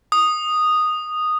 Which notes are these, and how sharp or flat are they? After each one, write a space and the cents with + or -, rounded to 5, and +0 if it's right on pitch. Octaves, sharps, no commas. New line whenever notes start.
D#6 -10